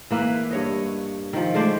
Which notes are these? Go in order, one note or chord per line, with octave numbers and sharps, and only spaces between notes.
E3 A#3 E4 B4
G2 C#5 D#5
D#3 F3
G#3 A3 C5 D5